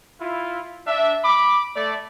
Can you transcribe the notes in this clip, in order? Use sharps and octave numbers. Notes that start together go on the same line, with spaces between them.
E4 F4
D4 E5
B5 D6
A3 D5